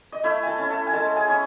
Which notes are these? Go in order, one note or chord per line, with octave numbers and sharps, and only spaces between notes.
D#5
A3 E4 E5
A4 G#5 A5
C#4 E4
A4 A5
G#5
G#3 A4 A5
G#4 G#5
C#4 E4